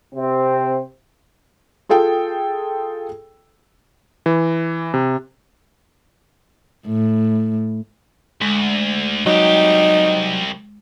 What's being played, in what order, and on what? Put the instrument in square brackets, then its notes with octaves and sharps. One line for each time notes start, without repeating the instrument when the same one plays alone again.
[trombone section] C3 C4
[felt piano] F4 G#4 A4 G5
[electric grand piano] E3
C3
[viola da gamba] A2
[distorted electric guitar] D2 [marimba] G#3
[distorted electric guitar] C2 G4 [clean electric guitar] F#3 [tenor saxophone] D#4